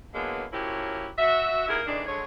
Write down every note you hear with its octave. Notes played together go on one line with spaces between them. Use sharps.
D3 E3 F#3 G#3 A#3 B3
F3 F#3 A#3 C#4 E4 G4
F#4 E5
D#2 A#3 B3 E4 G#4 A#4
D#3 E3 G#3 A3 D4
D3 G#3 C#5